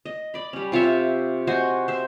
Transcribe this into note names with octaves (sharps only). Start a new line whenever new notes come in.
D#5
D5 B5
G3 C#4
C3 F4 C#5 E5
F#4 C5 D#5 G#5
C5 E5